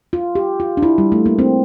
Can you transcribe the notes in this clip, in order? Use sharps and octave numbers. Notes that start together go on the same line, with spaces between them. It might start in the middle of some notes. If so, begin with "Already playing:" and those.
F4
G4
F4
D4
E4
G3
A3
A#3
C4